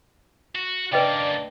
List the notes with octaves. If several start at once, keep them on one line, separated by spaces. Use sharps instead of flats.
F#4
C#3 A#3 D4 B4 D5 D#5 G5